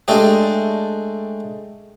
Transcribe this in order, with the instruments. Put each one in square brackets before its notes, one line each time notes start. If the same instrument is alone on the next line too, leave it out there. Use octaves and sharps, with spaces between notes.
[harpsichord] G#3 A3 D4 G4